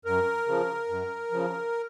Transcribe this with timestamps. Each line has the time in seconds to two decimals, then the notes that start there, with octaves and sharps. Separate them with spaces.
0.05 F#2 A#4
0.47 C#3 F3
0.88 F#2
1.32 C#3 F3